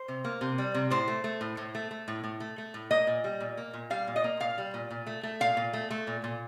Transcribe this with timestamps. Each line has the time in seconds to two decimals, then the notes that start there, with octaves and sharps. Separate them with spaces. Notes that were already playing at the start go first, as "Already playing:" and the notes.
Already playing: C5
0.08 C3
0.24 A#3
0.41 C3
0.58 G3
0.74 C3
0.90 A2 C5
1.08 A3
1.24 A3
1.41 A2
1.57 A2
1.75 A3
1.91 A3
2.08 A2
2.24 A2
2.40 A3
2.58 A3
2.74 A2
2.91 A#3 D#5
3.07 A#2
3.24 G3
3.40 A#2
3.57 A#3
3.74 A#2
3.90 G3 F5
4.07 A#2
4.16 D#5
4.24 A#3
4.40 A#2 F5
4.58 G3
4.74 A#2
4.91 A#2
5.07 A3
5.23 A3
5.40 A#2 F5
5.57 A#2
5.73 A3
5.90 A3
6.07 A#2
6.24 A#2